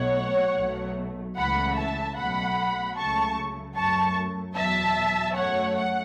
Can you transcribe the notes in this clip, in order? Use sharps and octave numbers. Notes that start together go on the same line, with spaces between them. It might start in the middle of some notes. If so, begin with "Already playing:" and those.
Already playing: B1 B2 A3 C#5 F#5
B1 B2 F#3 A3
C#2 C#3 E3 A3 F#5 B5
E5 A5
B1 B2 F#3 A3 F#5 B5
C#2 C#3 F#3 A3 A5 C#6
F#2 F#3 A3 A5 C#6
E2 B2 F#3 E5 A5
F#2 F#3 A3 C#5 F#5
F#5